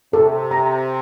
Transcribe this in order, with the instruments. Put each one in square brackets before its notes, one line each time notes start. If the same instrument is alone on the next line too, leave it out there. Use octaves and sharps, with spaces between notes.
[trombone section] C3 [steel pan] A4
[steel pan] A#5